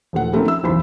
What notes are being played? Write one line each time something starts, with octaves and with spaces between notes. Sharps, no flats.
D#1 F3 A3 F#5
F3 A3 A#3 C4 C#4 D#4
E5 E6
F#1 B1 E2 C5 B5